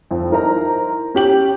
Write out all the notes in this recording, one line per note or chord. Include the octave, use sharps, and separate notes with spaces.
F2
D#4 E4 A#4 C5 A#5
C#4 G4 F#7